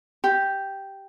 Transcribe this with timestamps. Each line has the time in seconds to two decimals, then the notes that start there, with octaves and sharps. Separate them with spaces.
0.24 G4